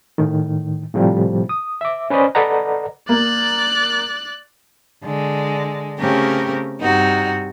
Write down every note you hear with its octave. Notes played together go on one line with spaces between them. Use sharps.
A2 D#3
A2 C3 F3 G3
D#6
E5 D6
C#4 B4 C5 D5 D#5
A4 B4 D5 D#5 F#5 A#5
A#3 D5 F#6
D3 G#3
C#3 A3 C4 C#4 G4 A#4
G2 C3 D#4 F#4